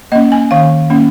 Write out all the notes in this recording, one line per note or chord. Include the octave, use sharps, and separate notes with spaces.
A#3 C#4 D#5
G#5
D#3 F5
A#3 C#4